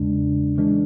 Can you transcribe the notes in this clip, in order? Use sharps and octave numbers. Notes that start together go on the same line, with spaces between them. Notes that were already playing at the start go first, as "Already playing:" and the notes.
Already playing: E2 C#3 G#3 D4
E3 G#3 D4